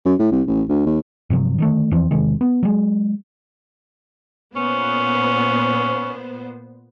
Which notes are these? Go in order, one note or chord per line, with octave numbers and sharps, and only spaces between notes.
F#2
A2
C2
A1
D2
D#2
G2 C3 F3 F#3
D3 D#3 A3
E2 E3 F3 C4
E1 C3 D#3 G#3
B3
F#3 G#3
A#2 B3 C#4 C5